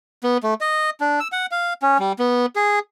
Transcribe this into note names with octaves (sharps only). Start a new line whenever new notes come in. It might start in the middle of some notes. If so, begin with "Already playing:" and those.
B3
A3
D#5
D4
E6
F#5
F5
C#4
G3
B3
G#4